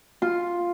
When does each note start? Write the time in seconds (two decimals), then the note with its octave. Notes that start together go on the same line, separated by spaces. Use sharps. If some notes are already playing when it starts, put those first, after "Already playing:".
0.22 F4